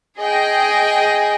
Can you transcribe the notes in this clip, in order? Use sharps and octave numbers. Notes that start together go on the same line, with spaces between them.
G#4 D#5 G5